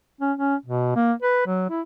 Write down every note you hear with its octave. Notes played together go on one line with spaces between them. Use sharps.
C#4
C#4
B2
A#3
B4
F#3
E4